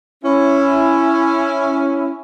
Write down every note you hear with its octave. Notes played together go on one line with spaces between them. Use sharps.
C#4 E4